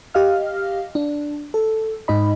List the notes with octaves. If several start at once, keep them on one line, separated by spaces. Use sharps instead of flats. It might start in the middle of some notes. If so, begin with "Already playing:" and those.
G4 D#5 F5 F6
D4
A4
G#2 D#4 D#5 B5